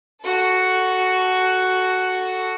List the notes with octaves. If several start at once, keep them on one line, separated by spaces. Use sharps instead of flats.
F#4 A4